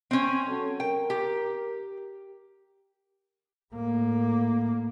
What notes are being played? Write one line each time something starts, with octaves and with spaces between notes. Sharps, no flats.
C4 C#4
F#3 A4
A#4 G5
G4
A2 A#3